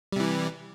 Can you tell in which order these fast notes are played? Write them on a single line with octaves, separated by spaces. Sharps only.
G3 C3 E3